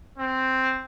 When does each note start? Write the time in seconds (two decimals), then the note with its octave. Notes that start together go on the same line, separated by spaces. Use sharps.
0.18 C4